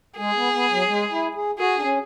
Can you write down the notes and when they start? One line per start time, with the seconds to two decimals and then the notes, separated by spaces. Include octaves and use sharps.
0.18 G#3 G#4
0.36 B3
0.53 B3
0.71 F#3
0.88 G#3
1.11 E4
1.35 G#4
1.58 F#4 G#4
1.76 D4
1.82 C#4